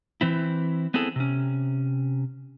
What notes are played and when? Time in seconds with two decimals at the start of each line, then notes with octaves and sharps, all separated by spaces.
0.21 E3 C4 E4
0.94 B3 C4 E4 G#4 A4
1.16 C3 C#4